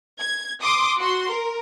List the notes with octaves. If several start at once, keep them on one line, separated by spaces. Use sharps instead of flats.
G#6
C6 D6 D#6
F#4 C6
A#4